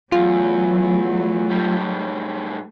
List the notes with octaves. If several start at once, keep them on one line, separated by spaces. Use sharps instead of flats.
E2 F#3 A3 F4
A2 G3